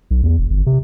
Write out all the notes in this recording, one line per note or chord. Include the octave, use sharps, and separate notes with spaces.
B1
E2
E1
G1
C3